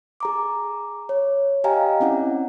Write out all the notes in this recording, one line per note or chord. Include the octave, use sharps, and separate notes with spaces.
G#4 A#5 D6
C#5
G4 D#5 F5 G5 G#5 A#5
C4 C#4 E4 D5 F#5